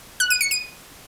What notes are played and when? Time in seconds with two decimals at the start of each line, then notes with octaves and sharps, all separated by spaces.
0.20 F#6
0.30 D#7
0.41 C#7
0.51 D#7